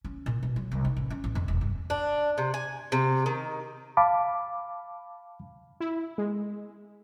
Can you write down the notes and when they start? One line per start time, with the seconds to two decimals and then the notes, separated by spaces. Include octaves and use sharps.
0.04 C#4
0.26 A#2
0.43 B2
0.56 F#3
0.71 C2
0.85 D#4
0.97 A1
1.10 C#4
1.24 A1
1.35 F2
1.48 E1
1.61 G2
1.90 D4
2.38 C3
2.54 G#5
2.92 C3
3.26 D#3
3.97 F5 A5 B5 D6
5.80 E4
6.18 G#3